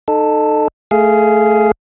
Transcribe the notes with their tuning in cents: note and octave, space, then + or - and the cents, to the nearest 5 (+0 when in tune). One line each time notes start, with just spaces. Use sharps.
D#4 -30 A4 +0
A3 +0 G#4 +15 F5 -15